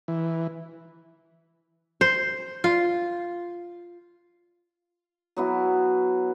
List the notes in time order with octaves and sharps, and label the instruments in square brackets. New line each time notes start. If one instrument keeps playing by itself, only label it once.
[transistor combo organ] E3
[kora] C5
F4
[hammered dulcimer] F#3 B3 E4 F#4